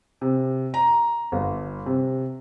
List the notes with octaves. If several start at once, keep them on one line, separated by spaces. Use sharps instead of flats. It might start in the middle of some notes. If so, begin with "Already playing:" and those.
C3
A#5
G1
C3